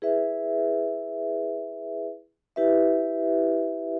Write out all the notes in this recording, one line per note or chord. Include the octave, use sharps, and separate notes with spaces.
E4 G#4 B4 E5
E4 G4 B4 E5